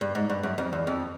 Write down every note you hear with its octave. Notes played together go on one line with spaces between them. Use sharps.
G2
G#2
G2
F#2
F2
E2
F2